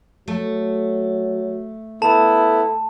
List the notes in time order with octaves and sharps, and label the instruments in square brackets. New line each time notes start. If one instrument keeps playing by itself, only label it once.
[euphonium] F#3 [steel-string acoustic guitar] A3
[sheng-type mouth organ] B3 E4 [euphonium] A4 [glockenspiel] A5